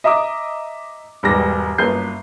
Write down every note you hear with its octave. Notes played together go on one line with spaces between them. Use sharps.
D#5 E5 A#5 D6 D#6
E1 G#2 G3 B3 D6 A#6
G1 F#2 A#3 B4 G6 C7